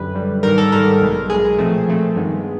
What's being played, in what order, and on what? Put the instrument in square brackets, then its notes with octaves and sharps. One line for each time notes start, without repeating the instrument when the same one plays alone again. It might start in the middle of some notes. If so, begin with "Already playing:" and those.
Already playing: [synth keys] F#2 D3 G3 B4
F#2 D3 G3
G#2 D#3 G3 A#4
A4
G#2 D#3 G3 A#4
B1 B2 G#3
B1 B2 G#3 G#4
A#2 F3 A3 C4
A#2 F3 A3 C4
G2 D#3 G#3 B3
B3